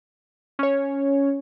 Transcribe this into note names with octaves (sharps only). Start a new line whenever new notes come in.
C#4 C#5